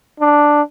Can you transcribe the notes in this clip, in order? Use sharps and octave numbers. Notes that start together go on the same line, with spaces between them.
D4